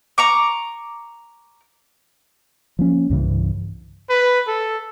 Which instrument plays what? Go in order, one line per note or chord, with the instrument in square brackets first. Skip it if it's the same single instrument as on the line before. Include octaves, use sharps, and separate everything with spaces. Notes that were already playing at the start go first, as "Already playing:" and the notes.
[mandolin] A#5 C#6 D6
[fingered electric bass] F3 A#3 C#4
C2 G2 C#3 E3
[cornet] B4
A4